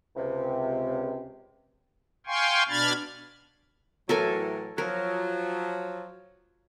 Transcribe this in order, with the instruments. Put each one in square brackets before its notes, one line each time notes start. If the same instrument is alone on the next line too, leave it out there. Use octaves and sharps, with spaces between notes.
[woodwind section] C#2 C3
[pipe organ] F5 G5 G#5 C6 C#6
B2 D4 B5 F6 G#6 A6
[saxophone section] A2 E3 F#3 [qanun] A4 A#4 G#5
[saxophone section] F3 F#3 [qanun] A#4